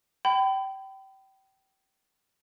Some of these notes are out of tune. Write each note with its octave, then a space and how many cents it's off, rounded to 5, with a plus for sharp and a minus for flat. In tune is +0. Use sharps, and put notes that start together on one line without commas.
G5 -25 B5 +30